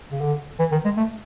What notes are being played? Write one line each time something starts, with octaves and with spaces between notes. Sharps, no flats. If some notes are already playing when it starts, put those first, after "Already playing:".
C#3
D3
E3
D#3
G#3
A3